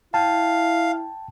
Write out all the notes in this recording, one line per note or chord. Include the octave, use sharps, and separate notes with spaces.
E4 F5 G5 A5